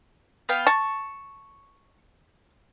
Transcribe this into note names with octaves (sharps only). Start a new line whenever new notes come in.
B3 F5 G5
A5 C#6